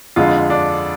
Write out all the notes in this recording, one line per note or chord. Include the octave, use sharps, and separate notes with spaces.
F2 D3 G#3 F4
D4